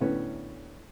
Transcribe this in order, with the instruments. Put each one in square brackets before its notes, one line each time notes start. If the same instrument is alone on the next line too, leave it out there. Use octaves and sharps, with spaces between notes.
[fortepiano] D2 A2 B3 C#4 B4